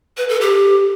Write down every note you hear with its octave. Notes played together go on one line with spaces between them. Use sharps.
B4
A4
G4